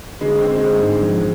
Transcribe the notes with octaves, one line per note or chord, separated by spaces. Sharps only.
D3 G#3
C4
D4
G#3
G#2
F3